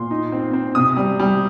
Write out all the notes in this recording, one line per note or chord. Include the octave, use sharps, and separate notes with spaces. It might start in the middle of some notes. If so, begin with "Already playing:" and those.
Already playing: A#2 C6
D#4
C4
C4
C3 D#6
G3
G3